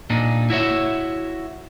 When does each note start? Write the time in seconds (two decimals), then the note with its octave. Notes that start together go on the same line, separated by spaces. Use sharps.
0.10 A#2 D4 D#4
0.50 E4 F#4 C#5 E5